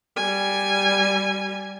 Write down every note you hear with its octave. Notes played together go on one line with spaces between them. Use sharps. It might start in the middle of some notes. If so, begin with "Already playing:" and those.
G3 G#5